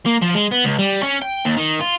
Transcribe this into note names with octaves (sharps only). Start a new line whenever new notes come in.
A#3
F3
G#3
B3
C#2
G3
C#4
G5
D#2
D#3
F4